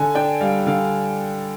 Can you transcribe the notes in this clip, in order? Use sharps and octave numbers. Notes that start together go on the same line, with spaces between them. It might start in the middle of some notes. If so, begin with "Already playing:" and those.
Already playing: D3 G#5
D4 G5
G3 F5
D3 F5